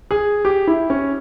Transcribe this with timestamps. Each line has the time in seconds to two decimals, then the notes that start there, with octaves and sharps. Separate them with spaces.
0.11 G#4
0.45 G4
0.67 E4
0.90 C#4